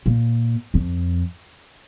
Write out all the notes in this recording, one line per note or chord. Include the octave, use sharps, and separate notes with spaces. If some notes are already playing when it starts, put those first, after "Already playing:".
A#2
F2